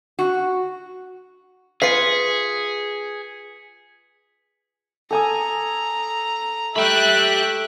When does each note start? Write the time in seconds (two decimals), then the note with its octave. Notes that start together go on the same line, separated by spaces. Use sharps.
0.19 F#4
1.82 F4 G#4 B4 F5 B6 C#7
5.11 A4 G#5 A#5 D#6
6.76 A3 G4 E5 G5 B5 F#6